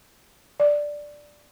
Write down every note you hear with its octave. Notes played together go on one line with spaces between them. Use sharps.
D5